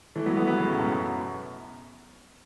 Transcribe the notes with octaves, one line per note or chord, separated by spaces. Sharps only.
E3 A3
F#3 B3
F#3 B3
F#3 B3
C#3 F#3
A2
F#2 B2